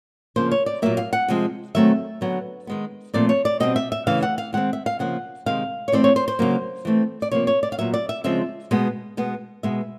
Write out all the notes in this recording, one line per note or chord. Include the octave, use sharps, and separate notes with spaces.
C#3 F3 A#3 C5
C#5
D5
A#2 F#3 A#3 E5
F5
F#5
C3 F3 G#3 C4
D#3 F#3 A3 C4 E5
D3 F#3 B3
D#3 G#3 B3
A#2 F3 A3 C4 D5
C#5
D5
B2 G3 C4 D#5
E5
E5
C#3 E3 A3 F5
F#5
F5
D#3 G#3 C4 F#5
E5
F5
C#3 F3 A#3 F#5
C3 D#3 G#3 F5
C#5
E3 A3 C4 D5
C#5
C5
C5
C#3 F#3 A#3
E3 A3 C4
D5
C3 F3 A#3 C#5
C#5
D5
F5
A#2 F#3 B3 E5
D5
E5
C#3 F3 G#3 C4 E5
B2 G#3 B3
B2 G#3 B3
B2 G#3 B3 E5